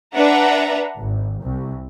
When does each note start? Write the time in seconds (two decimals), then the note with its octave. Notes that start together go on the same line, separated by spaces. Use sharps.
0.14 D4 B4 E5 F#5 A#5
0.98 G#1
1.41 C2